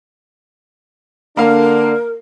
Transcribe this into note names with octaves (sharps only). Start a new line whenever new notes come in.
D3 A#3 D4 A#4 F5